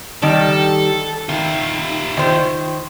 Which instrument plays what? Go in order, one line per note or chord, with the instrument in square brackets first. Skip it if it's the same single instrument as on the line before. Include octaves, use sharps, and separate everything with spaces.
[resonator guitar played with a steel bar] D#3 G3 [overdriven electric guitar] A4
[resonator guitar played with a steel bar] D#3 [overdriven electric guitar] F4 E5
[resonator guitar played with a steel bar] D#3 C5